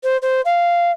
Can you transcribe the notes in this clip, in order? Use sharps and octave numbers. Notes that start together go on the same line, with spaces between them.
C5
C5
F5